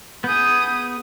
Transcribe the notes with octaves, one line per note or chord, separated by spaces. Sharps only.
B3 G#4 D#6 G6